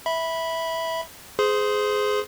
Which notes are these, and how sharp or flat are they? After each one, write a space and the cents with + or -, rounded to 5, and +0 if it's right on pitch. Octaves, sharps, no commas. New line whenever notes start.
E5 -10 B5 -5
G#4 +10 C5 -25 C6 +0